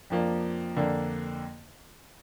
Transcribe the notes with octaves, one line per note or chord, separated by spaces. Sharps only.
F2 F3 A#3 D4
F2 D3 A#3 D4